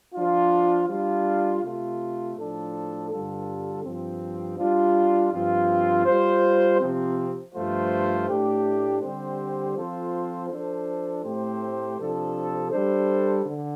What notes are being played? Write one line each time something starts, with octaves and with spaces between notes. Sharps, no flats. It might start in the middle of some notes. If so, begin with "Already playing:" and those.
F3 D4 F4
G3 D4 F4
C3 A3 F4
A2 F3 D4 A4
G2 D3 G3 F4 A4
G2 F3 C4
G3 D4 F4
G2 F3 C4 F4
G3 F4 C5
C3 F3 C4
G2 F3 A3 F4 C5
A2 A3 D4 G4
D3 G3 C4 G4 C5
F3 C4 F4 A4 C5
F3 D4 A4 C5
A2 A3 C4 G4 C5
C3 F3 D4 A4
G3 D4 A4 C5
D3